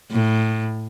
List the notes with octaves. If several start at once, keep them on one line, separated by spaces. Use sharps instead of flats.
A2